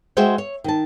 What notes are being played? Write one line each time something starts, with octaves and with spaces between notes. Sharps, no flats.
G#3 F#4 G#4 C5 E5 G5
C#5
D#3 A5